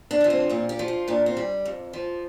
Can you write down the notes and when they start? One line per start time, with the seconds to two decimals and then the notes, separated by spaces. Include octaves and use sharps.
0.11 D4
0.20 D3 F3
0.30 C4
0.49 A#2 C4
0.69 G4
0.79 F3
0.88 F4
1.08 A#2 D4
1.26 C4
1.37 G3
1.65 F2
1.93 F3